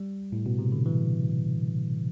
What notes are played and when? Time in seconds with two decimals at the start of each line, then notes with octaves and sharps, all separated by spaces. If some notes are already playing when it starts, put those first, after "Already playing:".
Already playing: G3
0.32 A2
0.46 B2
0.59 C3
0.72 D3
0.86 E3